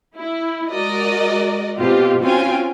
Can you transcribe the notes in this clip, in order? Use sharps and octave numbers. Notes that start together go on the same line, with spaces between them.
E4
G#3 F#4 A#4 D5 D#5
B2 C4 F4 G4
C4 C#4 F4 F#4 G5 G#5